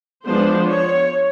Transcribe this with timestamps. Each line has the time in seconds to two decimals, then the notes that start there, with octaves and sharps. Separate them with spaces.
0.25 F3 G#3 B3 D4 C5
0.67 C#5